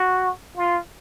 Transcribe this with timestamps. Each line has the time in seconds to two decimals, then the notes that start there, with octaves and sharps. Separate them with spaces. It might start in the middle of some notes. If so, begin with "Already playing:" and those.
Already playing: F#4
0.57 F4